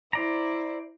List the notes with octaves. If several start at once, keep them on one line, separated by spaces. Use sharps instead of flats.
E4 C5 D5 A#5